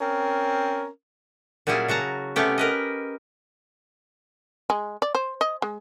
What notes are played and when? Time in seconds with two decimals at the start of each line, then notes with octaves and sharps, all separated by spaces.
0.01 C4 C#4 A#4
1.67 A#2 F#3 G3 C#4 E4 G#4
1.88 C#3 F#4 A5 A#5
2.36 C3 A3 B3 C#4 G4
2.58 A#4 B4 D#5
4.70 G#3
5.02 D5
5.15 C5
5.41 D#5
5.62 G#3